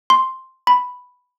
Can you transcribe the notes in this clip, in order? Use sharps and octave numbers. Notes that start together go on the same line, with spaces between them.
C6
B5